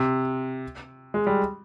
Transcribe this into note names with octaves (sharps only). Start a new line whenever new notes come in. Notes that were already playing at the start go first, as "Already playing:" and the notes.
Already playing: C3
G#3
G3